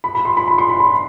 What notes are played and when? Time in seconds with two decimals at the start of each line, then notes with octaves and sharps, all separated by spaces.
0.04 B5
0.15 B5
0.25 C6
0.37 B5
0.48 B5
0.58 C6
0.69 B5
0.80 B5